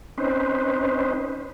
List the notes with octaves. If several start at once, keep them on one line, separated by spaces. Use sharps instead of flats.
C4 C#4 D#4 B4 C5